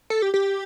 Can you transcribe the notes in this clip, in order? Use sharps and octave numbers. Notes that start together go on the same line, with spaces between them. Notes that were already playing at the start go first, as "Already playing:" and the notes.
A4
G4
G4